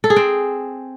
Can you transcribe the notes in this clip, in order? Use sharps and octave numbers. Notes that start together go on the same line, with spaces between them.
A4
G#4
C4